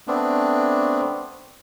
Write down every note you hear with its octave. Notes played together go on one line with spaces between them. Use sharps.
A3 B3 C4 D4